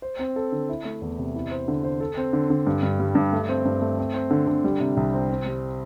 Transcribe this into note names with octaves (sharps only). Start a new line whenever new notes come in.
C5
C4
A4
D3
E4
A3
E2
C3
E4
C5
D3
C5
A4
C4
D3
D3
G2
G2
G3
G2
A3
C4
G2
A3
C4
C4
D3
D3
G3
C3
C2
C4
C4
G3